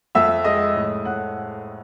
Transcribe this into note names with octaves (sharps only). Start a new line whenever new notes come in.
F2 E5 E6
G#3 D#5 D#6
A2
A2 F#5 F#6